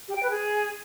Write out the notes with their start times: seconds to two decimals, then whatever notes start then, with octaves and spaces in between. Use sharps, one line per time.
0.08 G4
0.15 G5
0.22 B4
0.30 G#4